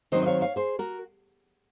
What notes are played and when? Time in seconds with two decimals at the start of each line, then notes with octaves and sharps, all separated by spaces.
0.12 D#3 F#3 C4 D#4 C5 D#5
0.23 D#5
0.26 C#5 F5
0.41 C#5 F5
0.56 G#4 C5
0.79 F#4 A#4